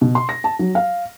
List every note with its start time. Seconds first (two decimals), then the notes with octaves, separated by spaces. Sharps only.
0.01 B2
0.15 C6
0.29 A#6
0.44 A5
0.59 F#3
0.75 F5